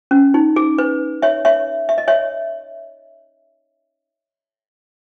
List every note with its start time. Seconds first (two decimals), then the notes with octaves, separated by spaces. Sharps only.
0.11 C#4
0.34 D#4
0.56 G#4
0.78 B4
1.22 C#5 E5
1.45 C#5 E5
1.89 E5
1.98 D#5
2.08 C#5 E5